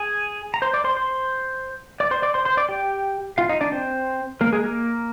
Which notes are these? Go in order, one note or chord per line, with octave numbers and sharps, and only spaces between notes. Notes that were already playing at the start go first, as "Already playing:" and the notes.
Already playing: G#4 G#5
A#5
C5 C6
D5 D6
C5 C6
C5 C6
D5 D6
C5 C6
D5 D6
C5 C6
C5 C6
D5 D6
G4 G5
F4 F5
D#4 D#5
D4 D5
C4 C5
A#3 A#4
G#3 G#4
A#3 A#4